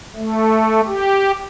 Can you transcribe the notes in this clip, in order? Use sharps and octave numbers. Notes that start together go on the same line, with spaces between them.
A3
G4